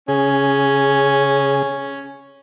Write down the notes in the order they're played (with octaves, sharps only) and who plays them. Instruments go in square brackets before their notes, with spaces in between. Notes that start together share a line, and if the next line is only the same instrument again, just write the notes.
[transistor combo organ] C#3 G#4 [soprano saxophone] C#4